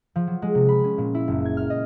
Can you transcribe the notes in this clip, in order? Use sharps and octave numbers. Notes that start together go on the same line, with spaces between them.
F3
F#3
G#3
C3
B5
C#4
A#2
E4
F#1
G#6
F6
D#5